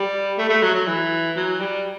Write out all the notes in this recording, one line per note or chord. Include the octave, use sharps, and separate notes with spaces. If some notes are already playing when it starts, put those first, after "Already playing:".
Already playing: G3
A3
A3
F#3
F#3
E3
F#3
G3